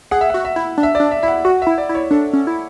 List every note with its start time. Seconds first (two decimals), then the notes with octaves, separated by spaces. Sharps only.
0.11 G#4 F#5
0.21 E5
0.30 F#4 F#5
0.45 E5
0.56 E4
0.78 D4
0.83 E5
0.95 D4 D5
1.11 E5
1.22 E4 E5
1.28 F#5
1.45 F#4 F#5
1.62 E4 E5
1.78 D5
1.89 E4
1.95 C#5
2.11 D4 A4
2.33 C#4
2.47 E4